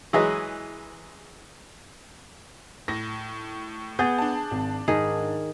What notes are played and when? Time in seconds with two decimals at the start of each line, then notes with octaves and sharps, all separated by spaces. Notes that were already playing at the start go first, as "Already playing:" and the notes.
0.13 E3 F#3 G#3 G#4 B4 D#5
2.88 A2 A#6
3.99 B3 G#4 G6 A6
4.18 D4 A5
4.51 G#1
4.88 G#2 D#3 G#4